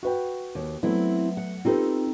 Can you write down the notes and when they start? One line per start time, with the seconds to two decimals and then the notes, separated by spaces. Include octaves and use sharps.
0.03 F#4 B4 G5
0.55 D#2
0.83 F#3 A3 B3 C4 E4
1.37 F#5
1.65 C4 D#4 F4 G4 A4 B4